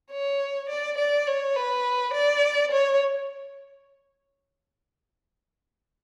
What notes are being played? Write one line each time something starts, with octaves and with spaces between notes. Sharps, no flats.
C#5
D5
D5
C#5
B4
D5
C#5